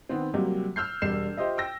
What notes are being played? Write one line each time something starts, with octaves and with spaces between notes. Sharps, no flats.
D#3 B3 C4
C3 F#3 G3 A#3
E6 F6 G6 C7
E1 G3 C7 E7
F4 G4 C5 D#5 E5
G5 E6 A#6